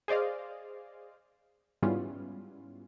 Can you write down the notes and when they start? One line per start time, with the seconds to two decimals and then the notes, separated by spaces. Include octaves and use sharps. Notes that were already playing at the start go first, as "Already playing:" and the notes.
0.08 G#4 C5 D5 D#5 F5
1.82 G#2 G3 B3 C#4 E4 F4